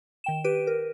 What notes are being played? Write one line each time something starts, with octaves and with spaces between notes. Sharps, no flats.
D#3 G5 E7
G4 B4 D7 D#7
A#4